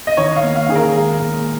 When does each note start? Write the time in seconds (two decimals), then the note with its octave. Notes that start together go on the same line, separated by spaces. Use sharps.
0.07 D#5
0.17 D#3 C#5
0.36 F5
0.43 A#3
0.56 F5
0.69 D#3 G#4
0.76 A#4
0.95 G#3
1.20 A#2